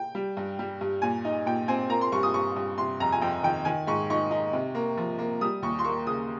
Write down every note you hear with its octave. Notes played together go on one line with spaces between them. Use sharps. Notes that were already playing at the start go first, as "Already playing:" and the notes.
Already playing: G5
G3
G2
G3
G2
A#2 G#5
D#4
A#2 G5
C4 G#5
A#3 A#5
C6
G2 C#6
D#6
G2 C#6
G2
C3 C6
F2 A#5
G#5
F2 G5
D#3 G5
D#3 G#5
G#2 C#6
D#4 C#6
D#4
C3
A#3
F3
A#3
G3 D#6
D#2 C#6
C6
A#3 C#6
C#3 D#6